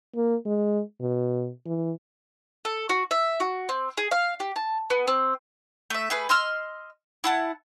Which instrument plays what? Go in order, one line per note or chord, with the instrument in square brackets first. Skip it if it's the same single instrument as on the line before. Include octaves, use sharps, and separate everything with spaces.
[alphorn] A#3
G#3
B2
E3
[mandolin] A4
F#4
E5
F#4
C4
G#4
F5
G4
A5
B3
C4
A3 E5
A3 G#4 B4
D#5 C6 E6 F6
E4 F#5 A5